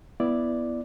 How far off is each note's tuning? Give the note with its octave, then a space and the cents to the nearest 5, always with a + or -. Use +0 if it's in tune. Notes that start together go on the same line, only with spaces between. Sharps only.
B3 +0 E4 +10 D5 +0